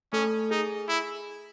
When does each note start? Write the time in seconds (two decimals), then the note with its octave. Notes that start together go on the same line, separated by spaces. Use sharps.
0.13 A3 C#4 A4
0.50 D#4 G#4
0.88 E4